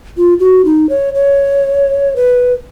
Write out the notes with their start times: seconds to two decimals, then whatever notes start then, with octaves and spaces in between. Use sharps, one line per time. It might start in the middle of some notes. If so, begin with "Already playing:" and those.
0.17 F4
0.40 F#4
0.65 D#4
0.89 C#5
1.15 C#5
2.16 B4